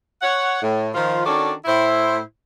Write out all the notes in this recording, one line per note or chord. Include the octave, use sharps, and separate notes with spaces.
C#5 F#5
A2
D#3 F3 F4
D#3 C#4 D4 F#4 A4 D5
A2 E4 C5